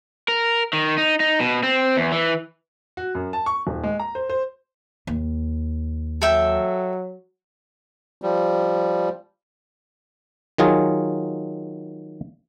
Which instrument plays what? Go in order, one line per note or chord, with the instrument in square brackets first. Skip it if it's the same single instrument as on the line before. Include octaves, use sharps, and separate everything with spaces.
[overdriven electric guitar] A#4
D#3
D#4
D#4
B2
C4
E2
E3
[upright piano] F#4
F#2
A5
C#6
D#1
G#3
A#5
C5
C5
[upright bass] D#2
[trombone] F#3 [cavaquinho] A4 E5 G5
[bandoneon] F3 G3
[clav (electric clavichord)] D#3 F#3 F4 G#4